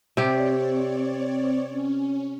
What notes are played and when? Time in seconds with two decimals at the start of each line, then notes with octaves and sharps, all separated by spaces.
0.17 C3 C4 G4 C#5 D5
1.69 C#4